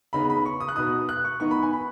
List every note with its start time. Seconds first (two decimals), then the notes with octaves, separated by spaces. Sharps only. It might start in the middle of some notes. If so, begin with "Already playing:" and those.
0.13 C#3 B3 D#4 B5
0.30 B5
0.46 C#6
0.60 D#6
0.68 F#6
0.76 B2 B3 D#4 D#6
1.09 F#6
1.25 C#6
1.40 D#3 B3 D#4 C#6
1.51 B5
1.63 G#5
1.73 B5